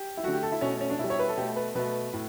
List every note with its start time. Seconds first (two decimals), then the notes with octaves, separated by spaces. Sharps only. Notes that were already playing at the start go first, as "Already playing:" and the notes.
Already playing: G4
0.17 E4
0.23 D3 A3 F#4
0.33 G4
0.42 A4
0.52 E4
0.61 B2 A3 C#4
0.81 C#4
0.90 D4
0.99 B2 G3 E4
1.10 C#5
1.19 B4
1.28 A4
1.37 B2 A3 G4
1.56 B4
1.75 B2 A3 B4
2.13 A2